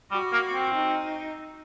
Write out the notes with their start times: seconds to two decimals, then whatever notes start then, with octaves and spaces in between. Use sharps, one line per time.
0.11 G3 F#4
0.32 A#3
0.53 C4
0.74 D#4